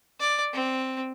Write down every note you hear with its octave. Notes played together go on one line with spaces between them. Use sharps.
D5
C4